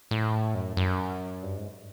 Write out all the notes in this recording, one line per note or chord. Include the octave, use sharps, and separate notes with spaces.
A2
F#2
F#2
G2
G#2